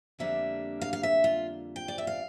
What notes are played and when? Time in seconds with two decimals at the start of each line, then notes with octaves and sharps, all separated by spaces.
0.19 F2 D3 G3 A#3 D4 E5
0.81 F5
0.93 F5
1.03 E5
1.24 F4
1.76 G5
1.88 D5
1.98 E5
2.07 F5